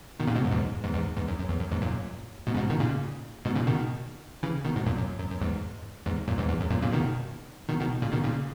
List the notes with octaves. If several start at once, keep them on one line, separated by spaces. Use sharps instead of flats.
B2 D#3
A#2 C#3
G#2 B2
F#2
E2 G#2
E2 G#2
E2 G#2
E2 G#2
F#2
F#2
E2
F#2
E2 G#2
F#2 A#2
G#2 B2
C#3
G#2 B2
B2 D#3
A#2 C#3
G#2 B2
A#2 C#3
B2 D#3
C#3 E3
B2 D#3
G#2 B2
F#2 A#2
F#2
F#2
F#2
E2 G#2
E2 G#2
F#2 A#2
E2 G#2
E2
F#2
F#2 A#2
A#2 C#3
B2 D#3
B2 D#3
B2 D#3
A#2 C#3
B2 D#3
A#2 C#3